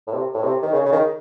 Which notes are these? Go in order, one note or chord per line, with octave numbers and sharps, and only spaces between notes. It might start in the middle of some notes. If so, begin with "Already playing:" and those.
A2
C3
A2
C3
D#3
C#3
C#3
D#3